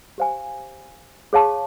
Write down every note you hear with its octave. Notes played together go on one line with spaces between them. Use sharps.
G4 C5 F5 G#5
G#4 C#5 F5 A5 C#6